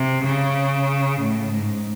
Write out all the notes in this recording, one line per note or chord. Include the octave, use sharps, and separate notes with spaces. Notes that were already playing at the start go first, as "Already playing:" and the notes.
Already playing: C3
C#3
A2
G#2